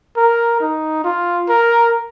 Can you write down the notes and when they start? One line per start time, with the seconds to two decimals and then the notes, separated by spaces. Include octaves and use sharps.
0.17 A#4
0.61 D#4
1.04 F4
1.49 A#4